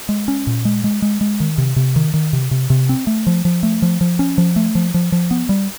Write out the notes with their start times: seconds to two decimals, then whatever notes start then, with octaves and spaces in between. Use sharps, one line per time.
0.09 G#3
0.28 C#4
0.47 A#2
0.65 G#3
0.84 G#3
1.02 G#3
1.21 G#3
1.40 D#3
1.58 C3
1.76 C3
1.96 D#3
2.14 D#3
2.33 C3
2.51 C3
2.70 C3
2.89 C4
3.07 A3
3.27 F3
3.45 F3
3.63 A3
3.82 F3
4.01 F3
4.19 C#4
4.38 F3
4.56 A3
4.75 F3
4.94 F3
5.12 F3
5.31 B3
5.49 G3